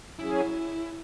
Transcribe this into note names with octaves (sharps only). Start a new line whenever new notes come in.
F#3 C#4 E4 G#4